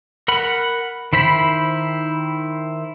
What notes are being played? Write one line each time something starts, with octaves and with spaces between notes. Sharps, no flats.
A#4 F#5 B5
D#3 E4 C5 B5